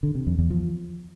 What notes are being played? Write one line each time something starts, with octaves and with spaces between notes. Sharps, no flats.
D3
C3
F2
E2
F3